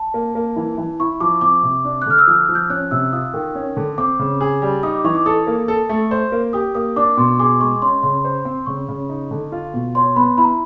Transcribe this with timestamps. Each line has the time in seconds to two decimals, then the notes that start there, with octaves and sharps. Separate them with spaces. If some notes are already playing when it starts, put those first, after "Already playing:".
Already playing: A5
0.14 A#3
0.35 A#3
0.56 E3
0.78 E3
1.00 E4 C#6
1.20 F3 D6
1.41 C4 D6
1.63 C3
1.85 D4
2.02 F#6
2.06 D3 F6
2.19 E6
2.27 F3 D#6
2.49 F3
2.55 G6
2.70 C#4 F#6
2.91 C3 E6
3.12 F4 D#6
3.34 D#3
3.55 C#4
3.77 D3
3.98 C4 D6
4.19 C#3
4.41 G#4
4.62 G3
4.83 D#4 D#6
4.94 D6
5.04 E3 C#6
5.15 D6
5.26 A4 D#6
5.47 A#3
5.68 A4
5.89 A3
6.11 C5
6.32 A#3
6.53 G4 D#6
6.75 A#3 D#6
6.96 D4 D6
7.17 B2 C6
7.39 G#4 D6
7.60 G#3 C#6
7.82 C#4 C6
8.03 C#3 C6
8.24 C5
8.45 C4
8.66 C#3 C#6
8.89 C#3
9.09 D#4
9.31 D3
9.52 F4
9.74 B2
9.95 C#5 C6
10.16 B3 B5
10.38 E4 B5
10.44 A#5